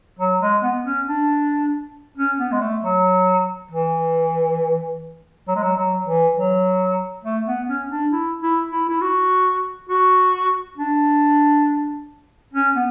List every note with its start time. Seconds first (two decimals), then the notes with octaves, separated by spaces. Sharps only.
0.19 F#3
0.42 G#3
0.63 B3
0.85 C#4
1.07 D4
2.17 C#4
2.39 B3
2.52 G#3
2.61 A3
2.83 F#3
3.71 E3
5.48 F#3
5.56 G#3
5.63 F#3
5.77 F#3
6.07 E3
6.37 F#3
7.24 A3
7.46 B3
7.68 C#4
7.91 D4
8.13 E4
8.43 E4
8.71 E4
8.89 E4
9.01 F#4
9.89 F#4
10.78 D4
12.54 C#4
12.75 B3